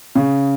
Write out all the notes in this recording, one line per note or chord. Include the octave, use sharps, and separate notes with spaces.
C#3